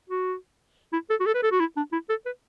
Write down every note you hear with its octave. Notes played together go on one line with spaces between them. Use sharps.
F#4
E4
A4
F#4
A4
B4
A4
F#4
E4
D4
E4
A4
B4